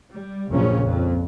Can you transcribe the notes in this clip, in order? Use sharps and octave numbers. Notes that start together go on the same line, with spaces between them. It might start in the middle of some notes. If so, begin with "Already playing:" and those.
G3
A#1 F#2 A#2 C#3 C#4
F2